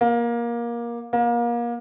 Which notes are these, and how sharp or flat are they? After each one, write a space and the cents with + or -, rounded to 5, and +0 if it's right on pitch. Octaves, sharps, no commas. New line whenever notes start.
A#3 +20
A#3 +30